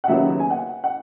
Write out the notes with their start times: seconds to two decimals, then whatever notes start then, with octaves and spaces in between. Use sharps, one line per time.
0.04 F#5
0.08 D#2 C#3 F#3 B3 E5
0.40 G#5
0.50 F#5
0.84 F#5